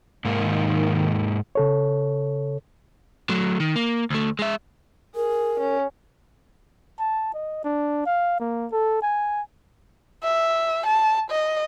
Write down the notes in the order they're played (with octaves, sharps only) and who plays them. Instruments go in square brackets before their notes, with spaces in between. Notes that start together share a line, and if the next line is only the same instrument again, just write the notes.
[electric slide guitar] G#2 A#3 [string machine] D#3
[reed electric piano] C#3 A4 C#5
[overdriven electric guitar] F#3 A3
D#3
A#3
D2 A3
G#3 E5
[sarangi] G#4 [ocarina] A#4
[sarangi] C#4
[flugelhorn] A5
D#5
D4
F5
A#3
A4
G#5
[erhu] E5
A5
D#5